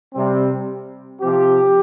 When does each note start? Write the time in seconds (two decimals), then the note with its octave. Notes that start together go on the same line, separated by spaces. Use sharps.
0.14 C3 G3 C4
1.22 C3 F3 C4 G4